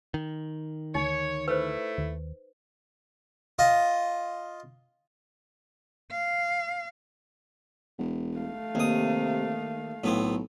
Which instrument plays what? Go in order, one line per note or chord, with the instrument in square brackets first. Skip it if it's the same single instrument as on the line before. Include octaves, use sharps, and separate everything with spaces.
[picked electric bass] D#3
[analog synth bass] D2 [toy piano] D#4 [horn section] C#5
[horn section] A3 E4 [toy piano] B4 C5
[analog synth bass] D#2
[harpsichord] F4 D#5
[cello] F5
[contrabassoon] E1
[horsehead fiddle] A3 F5
[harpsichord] D#2 D#6 [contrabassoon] C3
[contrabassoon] B1 [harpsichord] A2 B3 C4